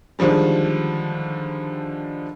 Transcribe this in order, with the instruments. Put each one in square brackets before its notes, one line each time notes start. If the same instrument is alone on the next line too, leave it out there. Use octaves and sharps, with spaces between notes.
[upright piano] D3 D#3 F3 G3 G#3